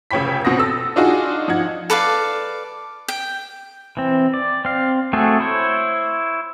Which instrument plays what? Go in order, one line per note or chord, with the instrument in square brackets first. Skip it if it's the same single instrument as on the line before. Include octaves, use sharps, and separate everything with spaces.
[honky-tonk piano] F1 C#3 C#5 G5 B5 B6
B2 C4 F#5 D#6 A#6
A4 E6 A6
D4 D#4 F4 F#4 G#4
F3 D#4 F#5 G#6
[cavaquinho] A4 B4 D5 F5
G5
[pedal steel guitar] E3 C4
D5
C4 F5
A3 C4 F#4 G#4 A4
E4 C5 C#5